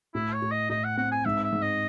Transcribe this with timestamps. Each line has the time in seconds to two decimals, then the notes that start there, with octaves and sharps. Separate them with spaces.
0.15 A2 E4
0.33 C#5
0.42 A2
0.51 D#5
0.70 A2 D#5
0.84 F#5
0.97 C4 F#5
1.11 G#5
1.25 G#2 E5
1.44 E5
1.52 G#2
1.62 D#5